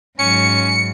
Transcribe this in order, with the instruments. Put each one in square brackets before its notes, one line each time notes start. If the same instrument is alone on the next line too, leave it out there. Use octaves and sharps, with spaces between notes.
[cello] G#2 F#3 [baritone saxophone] C#4 [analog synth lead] C#7